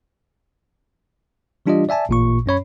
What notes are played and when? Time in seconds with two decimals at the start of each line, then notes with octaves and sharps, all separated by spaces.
1.66 E3 G3 D4 F4 G4 D#5
1.89 D5 E5 G#5 A5
2.09 A1 A#2 C#6
2.46 F#2 C#4 C#5 B5